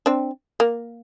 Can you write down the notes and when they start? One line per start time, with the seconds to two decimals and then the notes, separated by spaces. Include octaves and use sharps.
0.06 C4 D4
0.60 A#3